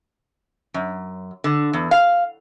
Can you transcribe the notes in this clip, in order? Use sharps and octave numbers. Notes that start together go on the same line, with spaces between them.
F#2
D3
E2
F5